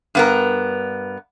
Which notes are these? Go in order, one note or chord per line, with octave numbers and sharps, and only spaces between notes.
G2 B3 A#4